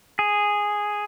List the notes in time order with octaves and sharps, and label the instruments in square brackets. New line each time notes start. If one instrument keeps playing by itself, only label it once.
[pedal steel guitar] G#4